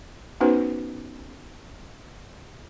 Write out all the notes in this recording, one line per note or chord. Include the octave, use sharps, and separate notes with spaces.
B3 C#4 D#4 F#4 B4 C5